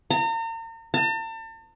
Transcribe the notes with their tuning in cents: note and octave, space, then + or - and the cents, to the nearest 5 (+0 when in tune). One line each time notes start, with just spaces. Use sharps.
A#5 -40
A5 +40